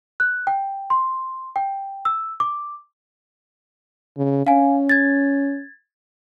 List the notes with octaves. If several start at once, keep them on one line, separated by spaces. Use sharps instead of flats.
F#6
G5
C6
G5
E6
D6
C#3
C#4 F5 G#5
G#6 A6